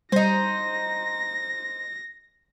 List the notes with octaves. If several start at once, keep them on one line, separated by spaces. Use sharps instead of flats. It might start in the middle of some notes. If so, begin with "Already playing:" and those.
G3 D#4 C5 A#6